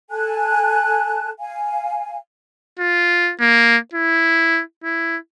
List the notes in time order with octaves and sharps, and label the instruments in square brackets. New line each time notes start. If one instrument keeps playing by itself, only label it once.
[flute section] A4 G#5 A5 F#6
F5 G#5
[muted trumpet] F4
A#3
E4
E4